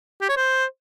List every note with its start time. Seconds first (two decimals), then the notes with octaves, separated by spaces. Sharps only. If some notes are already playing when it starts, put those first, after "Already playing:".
0.22 G4
0.29 C#5
0.37 C5